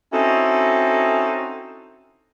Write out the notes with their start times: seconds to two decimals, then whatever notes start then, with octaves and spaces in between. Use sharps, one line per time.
0.13 C4 C#4 D#4 E4 F#4 A4